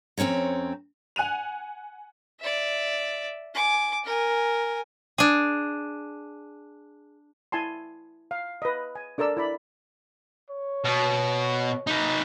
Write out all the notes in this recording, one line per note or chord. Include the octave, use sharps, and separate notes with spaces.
F2 C4 C#4 C#5 A#5
F#5 G#5 F#6 D#7 F7
D5 E5
G#5 D6
A#4 G#5
D4 G#4
E4 G#5 A5 C6
F5
B4 D#5
G#5
D4 A4 A#4 D5 E6
E4 D5 B5
C#5
B2
D#4 B4